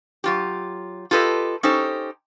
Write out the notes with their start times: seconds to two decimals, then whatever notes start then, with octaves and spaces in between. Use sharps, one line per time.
0.24 F#3 F4 G4
1.11 F4 G4 A4 B4 D#5
1.63 C#4 D#4 G4 A4 C5